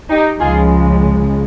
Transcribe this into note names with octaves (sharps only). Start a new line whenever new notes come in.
D#4 G4
C#2 C#3 F3 G#3 F4 G#4